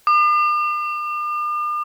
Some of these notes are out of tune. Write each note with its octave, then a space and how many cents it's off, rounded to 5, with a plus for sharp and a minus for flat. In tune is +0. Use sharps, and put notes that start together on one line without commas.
D6 +45